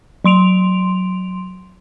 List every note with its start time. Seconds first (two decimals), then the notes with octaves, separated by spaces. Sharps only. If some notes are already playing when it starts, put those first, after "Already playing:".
0.24 F#3 C6 D7 F7